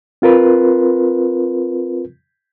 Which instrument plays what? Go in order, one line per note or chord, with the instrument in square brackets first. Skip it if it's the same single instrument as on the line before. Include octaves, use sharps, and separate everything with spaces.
[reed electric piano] C4 F4 A#4 B4